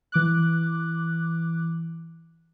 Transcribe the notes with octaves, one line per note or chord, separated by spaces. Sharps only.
E3 D6 F#6